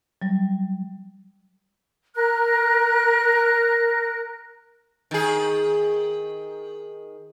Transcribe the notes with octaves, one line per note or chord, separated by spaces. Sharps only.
F#3 G3
A#4 F#6
D#3 G#4